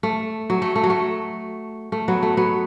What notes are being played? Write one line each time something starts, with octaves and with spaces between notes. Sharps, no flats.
A3
F#3
A3
A3
F#3
A3
A3
F#3 B3
A3
F#3 B3